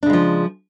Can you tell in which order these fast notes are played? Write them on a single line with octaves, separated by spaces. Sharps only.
D4 C#3 G#3 F3